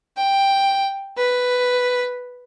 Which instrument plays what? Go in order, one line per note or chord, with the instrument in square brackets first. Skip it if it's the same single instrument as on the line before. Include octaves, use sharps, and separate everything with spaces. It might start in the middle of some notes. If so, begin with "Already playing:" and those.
[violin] G5
B4